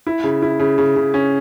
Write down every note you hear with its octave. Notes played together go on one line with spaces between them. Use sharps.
E4
C#3
E4
C#3
C#3
C#3
C#4